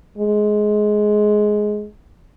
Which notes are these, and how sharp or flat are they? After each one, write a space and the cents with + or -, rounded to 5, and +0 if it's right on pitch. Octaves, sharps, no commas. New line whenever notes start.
G#3 +15